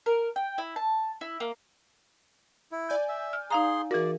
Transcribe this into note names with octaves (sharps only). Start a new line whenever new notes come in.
A#4
G5
E4
A5
E4
A#3
E4
D5 G#5 G6
E5
F6
D#4 G#4 F5 A#5 C6
E3 F#4 G#4 A#4 D5